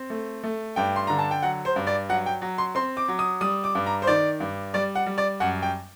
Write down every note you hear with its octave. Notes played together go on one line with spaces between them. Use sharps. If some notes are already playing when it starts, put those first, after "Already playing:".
Already playing: C4
A3
A3
G2 G5
C6
D3 A#5
A5
G5
F#3 F#5
C5
G2
D5
F#3 F#5
G5
F#3
C6
C4 C6
D6
F#3
D#6
G3 D#6
D6
G2
A#5
C5
D#3 D5
G2
G3 D5
F#5
G3
D5
F#2 F#5
G5